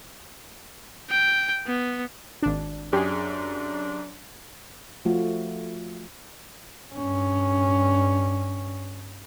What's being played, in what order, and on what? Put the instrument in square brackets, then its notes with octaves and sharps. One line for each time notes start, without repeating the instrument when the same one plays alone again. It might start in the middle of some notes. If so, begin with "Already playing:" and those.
[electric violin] G5
B3
[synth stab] G#1 D4
[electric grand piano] F#2 [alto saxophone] D4 [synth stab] G4 G#4
[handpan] F3 A3 F4 F#4
[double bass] G2 C#4